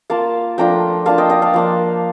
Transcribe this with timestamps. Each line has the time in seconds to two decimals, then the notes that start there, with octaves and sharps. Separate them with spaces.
0.10 A#3 F4 F5 A5
0.58 F3 A3 D4 F4 G5 A#5
1.06 A#3 D4 F4 F5 A5
1.18 D#5 G5
1.29 D#5 G5
1.42 F5 A5
1.54 F3 A#3 D4